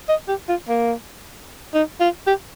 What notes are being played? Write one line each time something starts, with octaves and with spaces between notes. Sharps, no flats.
D#5
G4
F4
A#3
D#4
F4
G4